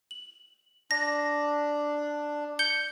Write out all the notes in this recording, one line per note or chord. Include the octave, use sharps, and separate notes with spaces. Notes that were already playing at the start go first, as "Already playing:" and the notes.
F#7
D4 A#6
G6 C#7 G7